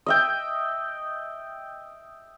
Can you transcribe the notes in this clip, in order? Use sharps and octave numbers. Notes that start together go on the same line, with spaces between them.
D#5 E5 G5